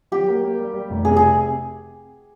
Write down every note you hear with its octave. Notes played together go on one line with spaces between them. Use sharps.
F#3 G4
A#3
A#3
G3
G3
F1
C3 G#4
G#4